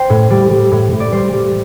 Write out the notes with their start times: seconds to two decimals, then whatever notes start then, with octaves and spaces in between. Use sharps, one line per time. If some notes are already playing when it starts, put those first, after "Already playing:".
Already playing: C5 G5
0.10 A2
0.30 G3
0.51 G3
0.71 A2
0.92 A2
1.00 D5
1.12 G3 C5
1.33 G3